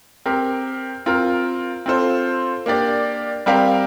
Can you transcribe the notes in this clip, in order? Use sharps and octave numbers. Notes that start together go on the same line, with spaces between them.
C4 G4 A#4
C4 F4 A#4
C4 F4 A4 C5
A#3 D4 G4 D5
G3 C4 G4 A#4 F5